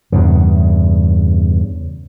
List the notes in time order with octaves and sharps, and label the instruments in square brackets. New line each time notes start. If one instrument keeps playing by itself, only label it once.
[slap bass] E2 G2 C#3